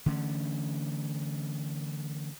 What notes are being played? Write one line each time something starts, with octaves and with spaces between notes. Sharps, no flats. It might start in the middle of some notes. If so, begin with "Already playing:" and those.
D3 E3 A3 C#4